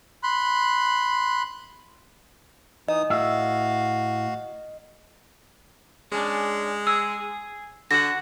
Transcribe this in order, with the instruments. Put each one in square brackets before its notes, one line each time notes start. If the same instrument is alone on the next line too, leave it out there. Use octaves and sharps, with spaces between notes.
[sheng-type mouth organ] B5 C6 F#6
[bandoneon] E3 D#4 D#6 [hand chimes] D#5
[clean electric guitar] A2 E5 [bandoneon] F#4 F5
[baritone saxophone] G#3 [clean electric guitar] C#4 D4
[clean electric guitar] G#4 [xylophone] E6
[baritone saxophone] D3 [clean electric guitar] F#4 F#5 [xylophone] A#6